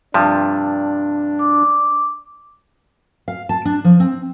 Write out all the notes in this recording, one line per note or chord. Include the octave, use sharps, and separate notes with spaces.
G2 C3 F3 D4
D6
F5
A5
D4
F3
C4